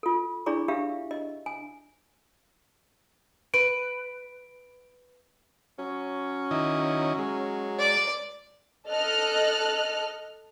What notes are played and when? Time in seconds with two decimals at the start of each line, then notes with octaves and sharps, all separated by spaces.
0.03 F4 A4
0.46 D4 E4 G#4 D5 C#6
0.68 D4 G4 E5 F5
1.11 D#5
1.46 G#5
3.54 B4 D7
5.79 F#3 C#4
6.51 D#3 E4 D#5
7.18 G#3
7.79 D5
8.88 A4 D#5 F6 F#6